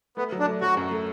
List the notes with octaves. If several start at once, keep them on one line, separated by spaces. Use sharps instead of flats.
A3 B3
F#3
D4
A3
F#3 F#4
F#2
A3